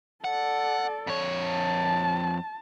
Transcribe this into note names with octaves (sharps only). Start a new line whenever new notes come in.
A4 D5 F#5
F2 C#5
A5